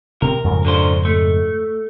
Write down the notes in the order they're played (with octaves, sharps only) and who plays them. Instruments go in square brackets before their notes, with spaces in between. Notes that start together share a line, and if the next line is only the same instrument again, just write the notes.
[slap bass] C3 C4 [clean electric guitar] A#4
[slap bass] F2 G#2 C#3
[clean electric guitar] D3 F#3 C5
A3